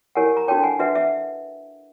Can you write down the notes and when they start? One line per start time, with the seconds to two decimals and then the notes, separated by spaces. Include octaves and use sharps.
0.15 E4 G4 A#4 C#5 F#5 G#5
0.37 A#5
0.48 D4 F#4 A4 C#5 G5 A5
0.63 F#5 G#5
0.79 D4 F#4 B4 E5 F#5
0.95 E5 F#5